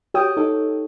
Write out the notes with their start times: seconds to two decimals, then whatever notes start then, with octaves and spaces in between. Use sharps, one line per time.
0.14 F#4 G4 C#5 G5 D#6
0.37 D#4 A4